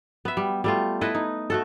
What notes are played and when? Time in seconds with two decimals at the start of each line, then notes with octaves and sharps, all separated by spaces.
0.25 B3 E5
0.37 G3
0.64 G3 A3 F4
1.01 E4 A4 B4 D#5
1.15 D#4
1.50 A3 F#4 A4